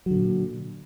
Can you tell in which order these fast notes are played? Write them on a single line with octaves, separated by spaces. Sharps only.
F#3 D3 A#2